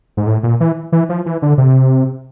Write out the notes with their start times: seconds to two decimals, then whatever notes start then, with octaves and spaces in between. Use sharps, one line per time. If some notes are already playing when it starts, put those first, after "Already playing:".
0.17 G#2
0.27 A2
0.43 A#2
0.60 E3
0.92 E3
1.09 F3
1.26 E3
1.42 D3
1.58 C3